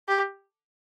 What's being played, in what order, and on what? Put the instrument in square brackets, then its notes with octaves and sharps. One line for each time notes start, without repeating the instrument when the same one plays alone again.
[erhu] G4